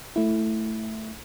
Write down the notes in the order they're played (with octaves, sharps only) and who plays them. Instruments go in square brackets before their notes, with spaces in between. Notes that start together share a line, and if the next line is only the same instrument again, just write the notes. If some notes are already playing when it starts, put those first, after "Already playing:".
[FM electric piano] A3 E4